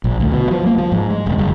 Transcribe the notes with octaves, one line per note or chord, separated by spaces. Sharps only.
A#1
D2
B2
F3
A#3
F3
G#2
G#3
E1
F#1